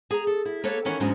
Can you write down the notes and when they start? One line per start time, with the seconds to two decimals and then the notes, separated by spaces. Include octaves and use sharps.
0.11 G#4 A#5
0.27 A4
0.45 E4
0.64 A#3 A4 B4 C#5
0.85 D#3 E3 C#4 F#4 A#4
1.00 E2 G#2 D3 F#3 G#3 C#4